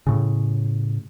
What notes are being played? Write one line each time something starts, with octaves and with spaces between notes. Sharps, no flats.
A2 C#3